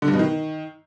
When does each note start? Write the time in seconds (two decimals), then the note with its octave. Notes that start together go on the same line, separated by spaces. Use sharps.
0.02 D3
0.08 G2
0.14 B2
0.19 D#3